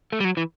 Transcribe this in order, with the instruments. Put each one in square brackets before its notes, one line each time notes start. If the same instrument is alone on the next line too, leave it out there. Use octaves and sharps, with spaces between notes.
[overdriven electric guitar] A3
G3
F#3
E3